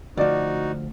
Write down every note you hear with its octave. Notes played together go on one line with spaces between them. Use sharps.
D2 F3 D#4 F#4 D5